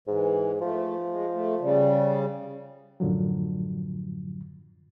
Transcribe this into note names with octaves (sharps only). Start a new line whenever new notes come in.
G#2 E3
F3 A3
G#3
A3
C#3 G3
F#2 A2 D3 F3 F#3